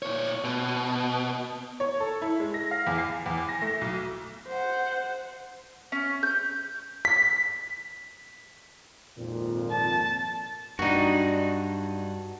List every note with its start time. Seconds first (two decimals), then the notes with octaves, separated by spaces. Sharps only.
0.03 A#2 C#5
0.44 B2
1.80 C#5
2.00 A4
2.22 E4
2.40 G#3
2.54 A#6
2.71 F5
2.87 E2
2.98 C7
3.26 E2
3.49 A#6
3.62 A3
3.81 B1
4.47 C5 F#5
5.92 C#4
6.23 G6
7.05 B6
9.18 G#1 F2 A#2
9.71 A5
10.79 G2 F#3 D4 D#4 F#4